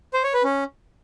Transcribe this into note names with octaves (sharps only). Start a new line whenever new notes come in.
C5
C#5
B4
C#4